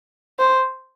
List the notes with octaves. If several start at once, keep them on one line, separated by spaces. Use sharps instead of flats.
C5